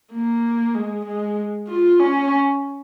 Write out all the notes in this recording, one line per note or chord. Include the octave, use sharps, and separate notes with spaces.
A#3
G#3
G#3
F4
C#4